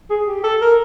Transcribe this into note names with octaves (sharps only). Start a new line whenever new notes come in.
G#4
G4
A4
A#4